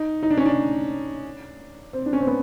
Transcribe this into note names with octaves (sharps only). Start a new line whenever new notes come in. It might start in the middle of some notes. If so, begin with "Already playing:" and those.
Already playing: D#4
D#4
D4
C#4
D4
C4
D4
C#4
C4
B3